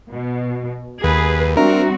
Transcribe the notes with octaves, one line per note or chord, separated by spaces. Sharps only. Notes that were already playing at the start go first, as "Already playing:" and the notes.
B2
D#2 G#4 B4
G3 C4 D4 F#4 A#4 E5 A#5